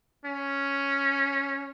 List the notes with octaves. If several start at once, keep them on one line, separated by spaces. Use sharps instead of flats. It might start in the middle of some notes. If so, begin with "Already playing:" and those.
C#4